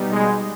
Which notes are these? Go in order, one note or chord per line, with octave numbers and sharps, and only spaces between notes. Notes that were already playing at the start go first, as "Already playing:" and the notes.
Already playing: B2 G3 B3 D#4
G#3